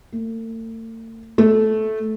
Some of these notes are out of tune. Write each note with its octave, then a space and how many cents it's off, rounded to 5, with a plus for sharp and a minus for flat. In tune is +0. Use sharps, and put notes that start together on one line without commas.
A3 +45
A3 -15